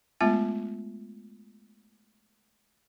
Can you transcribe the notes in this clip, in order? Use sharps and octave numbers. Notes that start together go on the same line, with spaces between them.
G#3 A3 B3 F4 E5 G#5